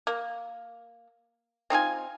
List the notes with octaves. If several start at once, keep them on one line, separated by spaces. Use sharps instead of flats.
A#3
C4 D#4 F4 G#5